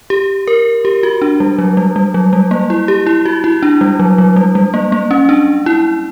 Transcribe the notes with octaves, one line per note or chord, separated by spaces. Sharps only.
G4
A#4
G4
F#4
D4
G3
F#3
G3
G3
F#3
G3
A#3
E4
G4
E4
F#4
E4
D4
G3
F#3
F#3
G3
G3
A#3
A#3
C#4
D4
E4